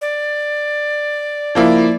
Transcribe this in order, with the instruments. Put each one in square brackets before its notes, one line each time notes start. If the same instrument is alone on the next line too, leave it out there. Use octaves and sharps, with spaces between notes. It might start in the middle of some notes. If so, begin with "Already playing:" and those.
[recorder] D5
[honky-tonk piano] F3 A#3 E4